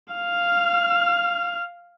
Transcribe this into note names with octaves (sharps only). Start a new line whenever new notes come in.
F5 F6